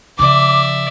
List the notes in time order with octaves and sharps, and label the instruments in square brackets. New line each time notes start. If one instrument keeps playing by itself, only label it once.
[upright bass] C#3 F3 [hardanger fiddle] D5 E5 [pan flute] D6